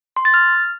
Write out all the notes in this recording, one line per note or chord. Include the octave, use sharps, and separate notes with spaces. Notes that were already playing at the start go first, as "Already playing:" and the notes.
C6
A6
F6